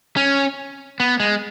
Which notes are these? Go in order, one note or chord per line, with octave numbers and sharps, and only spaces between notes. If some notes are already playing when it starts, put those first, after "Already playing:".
C#4
B3
G#3